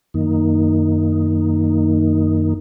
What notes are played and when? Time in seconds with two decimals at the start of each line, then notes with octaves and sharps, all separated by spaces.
0.14 F#2 D#3 A#3 D#4